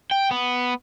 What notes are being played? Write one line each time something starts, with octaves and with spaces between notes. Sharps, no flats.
G5
B3